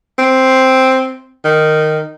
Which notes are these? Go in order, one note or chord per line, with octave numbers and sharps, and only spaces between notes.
C4
D#3